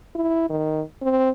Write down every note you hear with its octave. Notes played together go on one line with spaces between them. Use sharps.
E4
D#3
C4